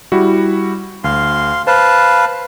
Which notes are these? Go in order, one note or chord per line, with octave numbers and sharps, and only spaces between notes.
G3 E4 F#4
D2 F5 C6
B4 C5 F5 A5